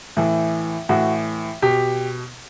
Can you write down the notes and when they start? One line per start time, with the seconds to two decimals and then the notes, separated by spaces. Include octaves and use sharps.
0.17 A2 E3
0.89 A2 E3 F#4
1.62 B2 G4